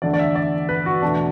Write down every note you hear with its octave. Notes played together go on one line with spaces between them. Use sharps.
E2 D3 A3 D5
D5
E5
D5
B4
F#4
E2 B2 A3 D4